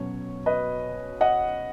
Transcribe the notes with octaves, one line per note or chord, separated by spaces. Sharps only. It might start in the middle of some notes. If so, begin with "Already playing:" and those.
Already playing: B2 F#3 C#4 C#5
B4 D#5
D#5 F#5